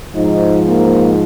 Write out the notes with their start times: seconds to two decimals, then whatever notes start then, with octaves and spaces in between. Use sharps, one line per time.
0.15 G#2 F3 D#4
0.67 A#3